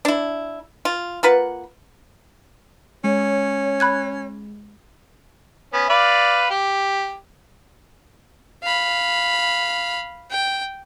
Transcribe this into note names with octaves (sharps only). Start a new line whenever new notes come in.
D4 E4
F4
A#3 F4 B4 F#5
G#3 C#4 C#5
B5 F#6 G#6
B3 C#4
B4 D5 F5
G4
F5 B5
G5